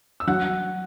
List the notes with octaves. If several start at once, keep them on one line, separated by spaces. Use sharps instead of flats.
E6
F#3 F#5 F#6